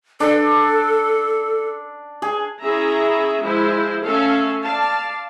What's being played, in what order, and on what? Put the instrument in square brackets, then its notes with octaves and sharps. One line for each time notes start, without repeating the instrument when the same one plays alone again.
[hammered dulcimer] D4 [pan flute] A4
[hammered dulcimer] G#4
[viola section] C#4 E4 G#4 E5 A#5
F3 G#3 E4 C5
A3 C#4 A4 E5 F5
D5 F5 A5